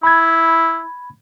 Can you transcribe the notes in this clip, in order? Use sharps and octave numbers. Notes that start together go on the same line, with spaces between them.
E4 B5 G#6